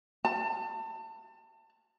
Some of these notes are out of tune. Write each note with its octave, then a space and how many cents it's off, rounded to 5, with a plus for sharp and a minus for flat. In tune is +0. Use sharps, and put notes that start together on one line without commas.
A5 +30